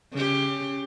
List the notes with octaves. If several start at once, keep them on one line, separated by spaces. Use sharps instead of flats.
C#3 G4